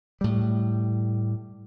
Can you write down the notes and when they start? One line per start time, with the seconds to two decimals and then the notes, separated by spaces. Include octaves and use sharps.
0.21 A2 G3